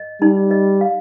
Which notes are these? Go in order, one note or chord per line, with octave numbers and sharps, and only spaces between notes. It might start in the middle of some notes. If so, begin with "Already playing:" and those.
Already playing: D#5
G3 D#4
D#5
F5